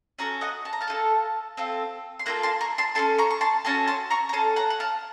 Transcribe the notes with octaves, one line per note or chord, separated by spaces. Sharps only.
C#4 F#4 A4 F#5 A#5
D#5 F#5
A5
A#5
F5 A5
A3 D#4 A4
C4 F4 A4
C6
A#3 F4 A4 F#5 A#5
A5 C6
A#5 C#6
A5 C6
C#4 F#4 A4 A5 C6
A#5 C#6
C#6
A5 C6
C#4 F#4 A4 A5 C6
A5 C6
A#5 C#6
A#5
C#4 A4 A5 C6
F#5 A#5
F#5
F5 A5